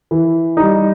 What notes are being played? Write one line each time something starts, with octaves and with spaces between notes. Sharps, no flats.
E3
G3 D#4